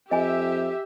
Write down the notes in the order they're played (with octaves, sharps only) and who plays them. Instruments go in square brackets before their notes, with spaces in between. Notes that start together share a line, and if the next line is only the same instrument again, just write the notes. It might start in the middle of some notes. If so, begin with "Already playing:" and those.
[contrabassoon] F2 [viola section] G4 E5 [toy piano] D#5 G#5